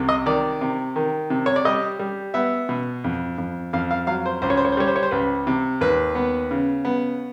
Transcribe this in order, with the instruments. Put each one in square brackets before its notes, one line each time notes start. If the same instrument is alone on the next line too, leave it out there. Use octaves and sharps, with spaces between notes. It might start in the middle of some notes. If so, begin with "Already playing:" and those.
Already playing: [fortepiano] C2 C3
D#5
D#3 D5
C3
D#3
C3
C#5
D5
G3 D#5
G3
B3 E5
B2
F2
F2
F2 F5
F5
F#3 F5
C5
C#2 C5
C#5
C5
C#5
C5
G3 C#5
C5
C#5
C5
C#2 B4
C3
D#2 B4
B3
C#3
B3